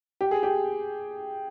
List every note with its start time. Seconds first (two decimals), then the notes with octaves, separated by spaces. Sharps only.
0.21 G4
0.31 G#4
0.43 G4